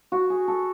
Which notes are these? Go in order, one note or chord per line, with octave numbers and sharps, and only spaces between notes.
F#4
G#4
A4